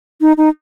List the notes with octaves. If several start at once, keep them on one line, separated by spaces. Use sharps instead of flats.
D#4
D#4